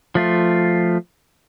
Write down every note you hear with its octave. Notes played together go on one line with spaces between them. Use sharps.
F3 A3 F4